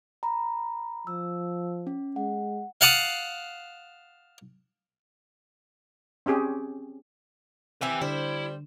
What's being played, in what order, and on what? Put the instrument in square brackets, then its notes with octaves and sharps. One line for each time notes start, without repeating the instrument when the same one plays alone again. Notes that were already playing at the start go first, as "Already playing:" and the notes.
[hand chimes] A#5 B5
[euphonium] F3 [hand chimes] E6
[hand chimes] C#4
[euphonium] G#3 [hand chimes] F#5
[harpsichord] F5 F#5 A5 D#6
[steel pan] C4 C#4 G4 G#4
[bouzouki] C4 E4 G4 [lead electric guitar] B4 G#5
[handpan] D3 D4 [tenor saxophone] G3 [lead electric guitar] E4 [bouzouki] C5